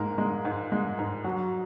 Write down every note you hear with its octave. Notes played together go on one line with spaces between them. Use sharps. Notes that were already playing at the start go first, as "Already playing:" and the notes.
Already playing: G#2 G#3 A#3 A#4
G#3
G#2
G#3
G#2
F#3